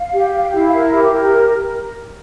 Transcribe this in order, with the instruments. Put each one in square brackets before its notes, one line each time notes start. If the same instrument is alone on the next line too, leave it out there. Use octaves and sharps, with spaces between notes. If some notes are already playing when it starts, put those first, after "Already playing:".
Already playing: [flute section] F5
G4
F5
E4
A#4
G4
A#4